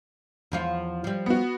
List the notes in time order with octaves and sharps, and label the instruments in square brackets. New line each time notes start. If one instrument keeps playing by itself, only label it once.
[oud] E2 F3 F4
F3 G3
[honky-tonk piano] B3 F#4